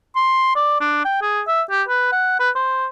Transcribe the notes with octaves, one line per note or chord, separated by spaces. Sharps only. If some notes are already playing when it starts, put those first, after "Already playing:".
C6
D5
D4
G5
G#4
E5
G4
B4
F#5
B4
C5